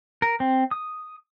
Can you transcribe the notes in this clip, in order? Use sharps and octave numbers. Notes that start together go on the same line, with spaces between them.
A#4
C4
D#6